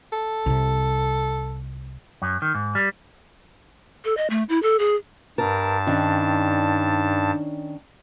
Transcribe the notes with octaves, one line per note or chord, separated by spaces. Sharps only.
A4
C2 C3
F#2
D#3
G#2
G3
A4
D#5
A3
E4
A4
G#4
G2 A#4 A5
D#3 C#4 D4